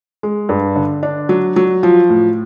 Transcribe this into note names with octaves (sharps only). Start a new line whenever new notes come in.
G#3
G2
D3
D4
F#3
F#3
F3
A2